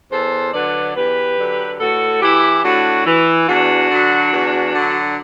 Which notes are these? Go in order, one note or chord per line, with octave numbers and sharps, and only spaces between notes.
E2 A4 C5
D3 F#3 B4 D5
E2 G4 B4
D3 F#3
A2 F#4 A4
E3 E4 G4
A2 D4 F#4
E3
E2 D4 F#4
D3 F#3
E2
D3 F#3